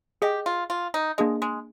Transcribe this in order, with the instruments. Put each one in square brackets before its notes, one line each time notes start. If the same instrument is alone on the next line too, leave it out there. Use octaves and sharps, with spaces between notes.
[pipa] G4 [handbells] G#4 D#5 G5
[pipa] F4
F4
D#4
[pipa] G#3 [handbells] A#3 D4 G#4 D#5
[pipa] G#3